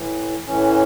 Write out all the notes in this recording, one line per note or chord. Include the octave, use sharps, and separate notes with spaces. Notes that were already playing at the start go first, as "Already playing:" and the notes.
Already playing: A2 E3
A2 E3 C#4